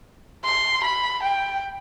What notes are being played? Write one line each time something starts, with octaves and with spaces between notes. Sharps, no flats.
C6
B5
G5